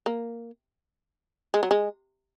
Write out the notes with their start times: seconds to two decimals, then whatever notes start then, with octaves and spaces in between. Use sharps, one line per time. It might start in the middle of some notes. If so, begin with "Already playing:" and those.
0.06 A#3
1.54 G#3
1.63 F#3
1.71 G#3